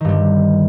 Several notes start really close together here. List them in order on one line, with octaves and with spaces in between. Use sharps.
D#3 G2 D3